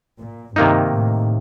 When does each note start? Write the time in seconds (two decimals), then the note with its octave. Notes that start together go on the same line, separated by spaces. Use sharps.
0.21 A#2
0.56 G2 C3 D#3 A#3 D#4
0.92 A2